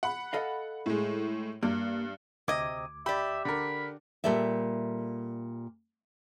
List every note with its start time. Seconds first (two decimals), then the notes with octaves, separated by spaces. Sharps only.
0.03 F#5 B5
0.33 A4 D#5 F5
0.86 A2 G#3
1.63 G2 A#3
2.48 D2 C3 D#5 D6 G#6
3.06 G4 D5 E5 B5
3.45 D3 A#4 B5
4.24 A#2 G3 A4 D5 E5